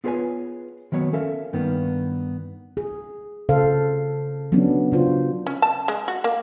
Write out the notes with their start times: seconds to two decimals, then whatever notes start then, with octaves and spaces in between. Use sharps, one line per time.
0.04 B3 F4 G#4 B4 C#5 G#5
0.92 D#3 F#3 B3 C#5
1.13 C#4 A4 A#4 E5 F5
1.53 G2 D#3 A#3 B3
2.77 G#4
3.49 C#3 A4 C5 F5
4.52 F#3 B3 C#4 D4
4.92 C#3 D4 F4 F#4 C5
5.47 C#4
5.62 A5
5.88 G#3
6.08 F#4
6.24 A#3